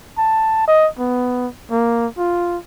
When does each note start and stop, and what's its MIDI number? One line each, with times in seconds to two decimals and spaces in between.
0.18 0.66 81
0.68 0.87 75
0.99 1.47 59
1.71 2.07 58
2.18 2.57 65